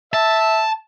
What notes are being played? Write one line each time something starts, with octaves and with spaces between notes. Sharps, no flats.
E5 A5